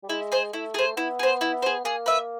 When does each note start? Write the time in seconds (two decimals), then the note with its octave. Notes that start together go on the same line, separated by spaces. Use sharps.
0.03 G3
0.09 G#3 E4
0.32 G#4 C5
0.53 A3 E4
0.74 G#4 C5
0.96 B3 E4
1.19 G#4 C5
1.41 E4
1.62 G#4 C5
1.85 A#3 G#4
2.06 B4 E5